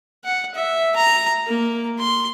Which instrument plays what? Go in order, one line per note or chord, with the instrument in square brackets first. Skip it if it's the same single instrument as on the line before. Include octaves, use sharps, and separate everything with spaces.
[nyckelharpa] F#5
E5
A#5
A#3
C6